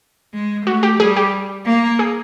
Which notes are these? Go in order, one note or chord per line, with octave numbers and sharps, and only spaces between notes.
G#3
A3 F#4
G4
G3 G#4
G4
A#3
G#4